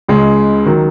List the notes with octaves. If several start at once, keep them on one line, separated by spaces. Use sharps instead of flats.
C#2 C#3 G#3
D#3 F#3